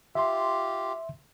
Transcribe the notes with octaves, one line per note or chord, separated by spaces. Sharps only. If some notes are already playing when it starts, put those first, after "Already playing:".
F4 G4 E5 C6